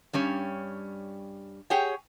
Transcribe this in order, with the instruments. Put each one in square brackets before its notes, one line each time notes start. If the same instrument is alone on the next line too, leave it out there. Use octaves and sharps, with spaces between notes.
[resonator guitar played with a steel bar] G2 G3 C#4 C#5
G4 G#4 C#5 F#5 G5